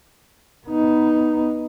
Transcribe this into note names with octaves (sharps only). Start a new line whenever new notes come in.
B3 D#4